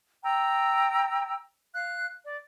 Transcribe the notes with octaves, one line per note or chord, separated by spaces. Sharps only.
G5 A#5 E6
F5 F#6
D5